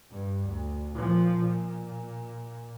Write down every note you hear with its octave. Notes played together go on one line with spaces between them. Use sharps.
G2
D2
A#2 F3
A#2